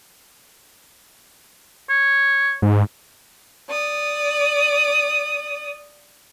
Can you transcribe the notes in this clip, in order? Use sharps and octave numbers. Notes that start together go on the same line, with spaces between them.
C#5
G#2
D5 D#6